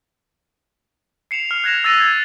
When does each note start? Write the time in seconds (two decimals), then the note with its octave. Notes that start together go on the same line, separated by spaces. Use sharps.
1.31 C7 C#7 E7 F7
1.51 F6
1.64 F#6 G#6 A#6 E7 F7
1.84 E6 F#6 A6 A#6 D#7
2.00 G#6